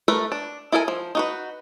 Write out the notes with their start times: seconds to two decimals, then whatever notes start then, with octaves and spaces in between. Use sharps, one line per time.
0.08 A3 A#4 B4 E5
0.32 D4
0.72 E4 A4 A#4 E5 G#5
0.88 F3
1.15 D#4 F#4 B4